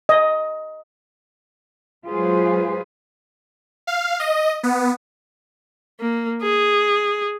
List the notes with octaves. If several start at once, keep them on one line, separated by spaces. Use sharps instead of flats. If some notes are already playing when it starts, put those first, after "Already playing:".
D#5
F#3 G#3 F4 G#4 B4 C5
F5
D#5
B3
A#3
G#4